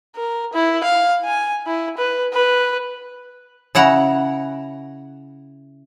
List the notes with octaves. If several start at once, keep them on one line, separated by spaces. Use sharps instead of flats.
A#4
E4
F5
G#5
E4
B4
B4
C#3 E4 F#5 A#5